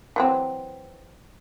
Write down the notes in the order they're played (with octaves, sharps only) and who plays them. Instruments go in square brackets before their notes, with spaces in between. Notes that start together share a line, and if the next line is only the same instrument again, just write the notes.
[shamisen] E3 F#3 C4